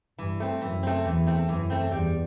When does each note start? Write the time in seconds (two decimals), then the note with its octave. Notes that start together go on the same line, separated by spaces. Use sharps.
0.18 G2 E3
0.40 A3 C4
0.61 F#2 E3
0.83 A3 C4
1.05 E2 E3
1.27 A3 C4
1.48 F#2 E3
1.70 A3 C4
1.91 E2 G3